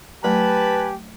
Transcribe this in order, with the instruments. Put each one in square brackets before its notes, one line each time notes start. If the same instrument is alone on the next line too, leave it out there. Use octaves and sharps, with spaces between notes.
[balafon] F#3 A3 [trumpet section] G4 G#5 A5 [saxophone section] B4